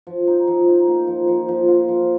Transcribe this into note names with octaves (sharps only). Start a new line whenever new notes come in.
F3
D#4
F3
D#4
A#3
F3
F3
F3
F4
F3